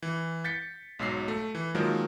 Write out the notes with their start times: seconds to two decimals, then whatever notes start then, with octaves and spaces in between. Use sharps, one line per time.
0.03 E3
0.44 G6 A6 B6 C#7
0.99 B1 G#2 F#3 E6 B6 C7
1.28 A3
1.55 E3
1.75 D#3 F3 F#3 G#3 A#3